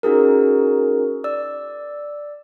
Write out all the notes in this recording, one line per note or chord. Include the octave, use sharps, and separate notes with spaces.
C#4 D#4 F#4 G#4 A#4
D5 E6